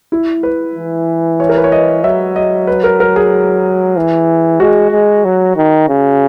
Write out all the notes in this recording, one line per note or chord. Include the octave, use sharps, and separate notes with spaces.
E4
B4
E3
C#5
A#4
B4
C#5
D#5
F#3 E5
D#5
B4
A#4
A#4
G#4
E3
G#3 F#4
G#3
F#3
D#3
C#3